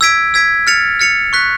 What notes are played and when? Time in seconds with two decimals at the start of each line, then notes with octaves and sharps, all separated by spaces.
0.01 E6 G#6 B6 D7
0.34 E6 G#6 B6 D7
0.67 F6 A6 C#7 F7
1.00 F6 A6 C#7 F7
1.33 C#6 F#6 B6